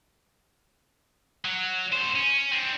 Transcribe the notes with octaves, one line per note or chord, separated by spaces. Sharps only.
F#3
F#2 C5
C#4
C4 D4